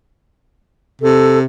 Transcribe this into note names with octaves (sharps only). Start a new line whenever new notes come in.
C3 A4